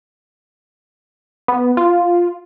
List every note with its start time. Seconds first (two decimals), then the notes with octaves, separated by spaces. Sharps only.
1.48 B3
1.77 F4